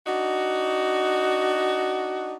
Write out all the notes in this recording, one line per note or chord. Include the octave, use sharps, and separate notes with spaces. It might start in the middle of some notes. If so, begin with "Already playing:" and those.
D4 D#4 F#4